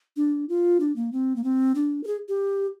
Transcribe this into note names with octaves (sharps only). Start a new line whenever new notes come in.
D4
F4
D4
A#3
C4
A#3
C4
D4
A#4
G#4
G4